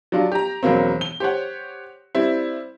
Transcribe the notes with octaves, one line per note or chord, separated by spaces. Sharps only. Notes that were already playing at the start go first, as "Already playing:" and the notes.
F#3 G3 D4 F4
G4 A#5
E1 F#3 A#3 C4
G7
G4 C5 C#5 F#5
G3 C4 E4